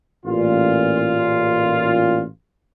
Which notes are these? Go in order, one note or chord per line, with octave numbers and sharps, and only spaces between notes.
A1 A#2 F4